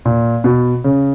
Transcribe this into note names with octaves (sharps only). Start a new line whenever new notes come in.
A#2
B2
C#3